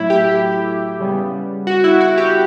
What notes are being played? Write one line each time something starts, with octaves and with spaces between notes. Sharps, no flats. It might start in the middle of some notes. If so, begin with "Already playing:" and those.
Already playing: A2 F#3 A3 E4
G4
C#3 G3 B3
F#4
E4
F#4
G4